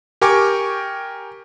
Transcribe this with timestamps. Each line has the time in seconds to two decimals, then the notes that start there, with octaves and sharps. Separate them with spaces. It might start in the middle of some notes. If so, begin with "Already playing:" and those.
0.22 G4 A#4 G5 G#5 C#6 D6